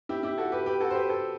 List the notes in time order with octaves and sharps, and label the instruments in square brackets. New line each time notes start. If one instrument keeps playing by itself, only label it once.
[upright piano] E4 G4
E4 G4
F#4 A4
G4 B4
G4 B4
F#4 A4
C5
G4 B4
A4 C5